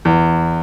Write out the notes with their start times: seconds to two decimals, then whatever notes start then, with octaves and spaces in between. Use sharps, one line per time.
0.05 E2